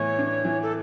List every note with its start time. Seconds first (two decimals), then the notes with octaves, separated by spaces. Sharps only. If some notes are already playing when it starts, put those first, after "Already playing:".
Already playing: A2 E3 B3 C#5
0.18 D4
0.45 E3
0.63 A4